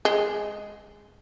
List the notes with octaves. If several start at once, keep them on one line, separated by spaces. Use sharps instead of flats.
G#3